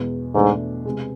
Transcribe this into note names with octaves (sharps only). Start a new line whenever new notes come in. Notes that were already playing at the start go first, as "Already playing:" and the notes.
Already playing: E2 B2 G#3
E2 G#2 B2 A3 D4
C3 G#3 B3